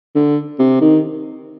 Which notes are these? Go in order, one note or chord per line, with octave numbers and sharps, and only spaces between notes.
D3
C3
D#3